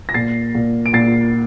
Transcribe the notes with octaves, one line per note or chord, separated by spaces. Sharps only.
A#6
A#2 A6 C7
A#2
D7
A#2 A6 C7